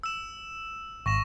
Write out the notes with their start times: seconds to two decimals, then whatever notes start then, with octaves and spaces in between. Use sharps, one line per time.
0.03 E6 E7
1.06 G#1 C#6 A#6 E7